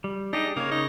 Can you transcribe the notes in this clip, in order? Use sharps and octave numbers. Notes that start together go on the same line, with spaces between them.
G3
D4 D#4 G4 G#4
C#3 A#3 C#5
D#4